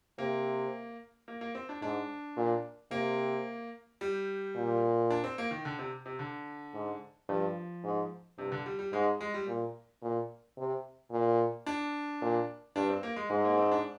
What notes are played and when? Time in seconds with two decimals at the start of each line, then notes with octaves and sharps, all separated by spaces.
0.18 C3 A#3
1.28 A#3
1.41 A#3
1.55 C4
1.69 D4
1.82 G#2 D4
2.37 A#2
2.91 C3 A#3
4.01 G3
4.56 A#2
5.10 D4
5.24 C4
5.38 A#3
5.51 D#3
5.65 D3
5.79 C3
6.06 C3
6.19 D3
6.74 G#2
7.29 G2 F3
7.84 G#2
8.38 G2 C3
8.52 D3
8.66 G3
8.79 G3
8.93 G#2 G#3
9.21 G#3
9.34 G3
9.47 A#2
10.02 A#2
10.57 C3
11.11 A#2
11.67 D4
12.21 A#2
12.76 G2 D4
12.89 C4
13.03 A#3
13.16 G#3
13.30 G#2 G#3
13.44 A#3
13.58 C4
13.72 D4